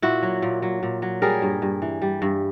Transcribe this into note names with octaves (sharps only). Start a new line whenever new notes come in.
A#2 E4 F#4
F#3
A#2
F#3
A#2
F#3
G3 G#4 A#4
G2
G2
E3
G3
G2